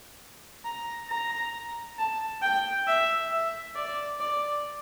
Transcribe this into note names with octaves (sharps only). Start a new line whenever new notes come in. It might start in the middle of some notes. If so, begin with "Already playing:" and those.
A#5
A#5
A5
G5
E5
E5
D5
D5